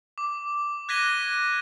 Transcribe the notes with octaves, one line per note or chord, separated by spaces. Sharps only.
D6
F#6 G#6 A#6 B6 D#7 G7